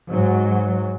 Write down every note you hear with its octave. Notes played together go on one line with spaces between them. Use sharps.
G#2 F#3